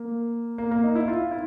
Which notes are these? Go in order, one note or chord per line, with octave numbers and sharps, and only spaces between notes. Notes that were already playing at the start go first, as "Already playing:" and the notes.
Already playing: A#3
A#3
A#3
D#4
E4
F4
E4